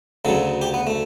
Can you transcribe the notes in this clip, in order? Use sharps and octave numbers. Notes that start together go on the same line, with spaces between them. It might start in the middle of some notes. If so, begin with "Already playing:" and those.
D2 C#3 F#3 A4
G4
B3
A3